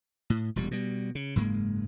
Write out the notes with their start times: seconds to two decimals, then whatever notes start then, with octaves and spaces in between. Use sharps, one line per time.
0.30 A2
0.56 E1 A#2 G3
0.71 B2 G3
1.15 C#3
1.36 F#1 G#2 G#3 A#3